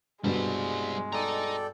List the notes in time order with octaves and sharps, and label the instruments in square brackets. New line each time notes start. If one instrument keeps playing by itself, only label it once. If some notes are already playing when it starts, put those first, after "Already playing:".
[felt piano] G2 B2 [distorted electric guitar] G3 C5 [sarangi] G#3
[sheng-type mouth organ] A4 D5 G5 [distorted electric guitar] D#5 A#5